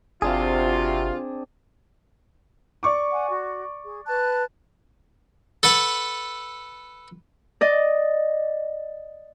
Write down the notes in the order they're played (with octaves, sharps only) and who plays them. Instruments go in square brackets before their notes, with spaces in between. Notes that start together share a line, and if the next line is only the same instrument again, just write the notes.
[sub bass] G1 [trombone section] C3 F#4 [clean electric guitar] C4 D4 G#4 [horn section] F4
[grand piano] D5 C#6 D6
[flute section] F#5 G#5
F#4
G#4
B4 A5 F#6
[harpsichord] A4 B4 F#5
[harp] D5 D#5